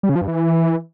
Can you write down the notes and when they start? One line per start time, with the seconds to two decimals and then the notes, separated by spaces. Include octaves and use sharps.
0.03 G3
0.09 C#3
0.15 F3
0.22 G2
0.28 E3